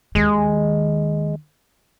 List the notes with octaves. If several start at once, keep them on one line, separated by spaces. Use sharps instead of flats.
D#2 D#3 G#3